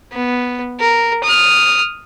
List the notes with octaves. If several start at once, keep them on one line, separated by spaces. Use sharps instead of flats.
B3
A#4
D#6 F6